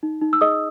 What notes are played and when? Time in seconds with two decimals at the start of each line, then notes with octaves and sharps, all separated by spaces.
0.03 D#4
0.21 D#4
0.33 E6
0.41 G#4 D#5 D#6